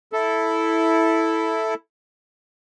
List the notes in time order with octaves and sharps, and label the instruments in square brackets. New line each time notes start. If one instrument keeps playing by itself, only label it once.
[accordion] E4 A4